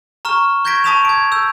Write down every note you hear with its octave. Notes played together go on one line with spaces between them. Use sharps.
A#5 C#6 F6 E7
C#6 G6 G#6 A#6 B6 D7
A5 C#6 D#6 B6 E7 F7
G#6 D7
E6 G6